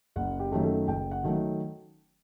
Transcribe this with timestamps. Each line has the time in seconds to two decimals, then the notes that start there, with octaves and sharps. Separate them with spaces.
0.16 F#1 F#5
0.40 G4
0.52 F#2 D#3 F#3 A3
0.64 A4
0.88 F#1 G5
1.11 F#5
1.24 D#3 F#3 A3